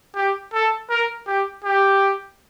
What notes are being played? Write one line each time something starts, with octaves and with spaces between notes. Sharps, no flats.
G4
A4
A#4
G4
G4